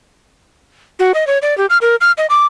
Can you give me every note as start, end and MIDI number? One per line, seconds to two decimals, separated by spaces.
0.99 1.12 66
1.14 1.27 75
1.27 1.38 73
1.42 1.57 74
1.58 1.66 67
1.70 1.78 89
1.81 1.95 70
2.01 2.12 89
2.18 2.26 75
2.30 2.46 86